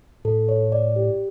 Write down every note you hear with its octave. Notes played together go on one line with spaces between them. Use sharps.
A2 A4
C#5
D5
G4